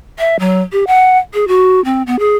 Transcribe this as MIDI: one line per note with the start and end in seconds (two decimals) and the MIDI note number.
0.19 0.36 76
0.40 0.62 54
0.72 0.84 67
0.87 1.18 78
1.34 1.47 68
1.48 1.83 66
1.85 2.03 60
2.07 2.19 59
2.19 2.37 68